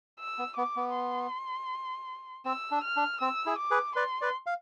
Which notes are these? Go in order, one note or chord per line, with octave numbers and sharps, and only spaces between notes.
E6
B3
B3 D6
B3
C6
C4 E6
D4
F6
D4
C4 E6
E4 G#4
D6
G#4 B4
B4 D5 C6
B4 D5
F5